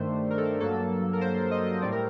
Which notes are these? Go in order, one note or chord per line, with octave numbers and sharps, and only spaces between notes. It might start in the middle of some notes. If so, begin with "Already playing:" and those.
Already playing: G2 D#3 A3 D4 C5
A#4
A4
A#4
G2 F#3 A#3 A4
A#4
C5
D#5
D#5
A2 G3 C4 D5
A#4